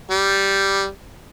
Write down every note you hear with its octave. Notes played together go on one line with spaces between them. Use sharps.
G3